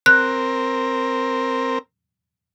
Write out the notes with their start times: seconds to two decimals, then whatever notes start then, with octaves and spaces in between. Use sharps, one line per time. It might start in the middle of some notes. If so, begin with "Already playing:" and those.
0.06 C4 A#4 F#6